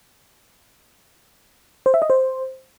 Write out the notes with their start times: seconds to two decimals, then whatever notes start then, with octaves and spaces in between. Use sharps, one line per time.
1.86 C5
1.94 E5
2.02 D#5
2.10 C5